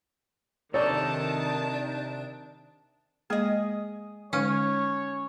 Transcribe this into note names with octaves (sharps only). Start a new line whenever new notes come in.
C3 D#3 D4 D#4 A4 C#5 D5 A5
G#3 A#3 G#4 D#5
D3 G#3 C#4 D#4 C#5